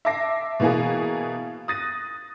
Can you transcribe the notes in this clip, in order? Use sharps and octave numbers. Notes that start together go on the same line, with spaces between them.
E5 A5 D6 A#6 C7
B2 E3 A#3 B3 G#4
D#6 F#6 A6 A#6 D#7